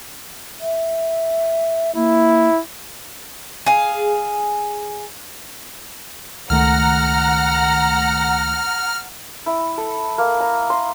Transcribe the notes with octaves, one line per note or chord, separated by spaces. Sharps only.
E5
A#3 E4
G#4 F5
C#2 D#3 A3 F#5 A#5 F6
E4
A4
A#3
A#5
C6